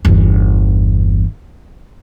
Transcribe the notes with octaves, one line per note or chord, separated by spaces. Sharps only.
G1 E2